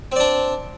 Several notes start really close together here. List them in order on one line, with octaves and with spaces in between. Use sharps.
C4 D5 D4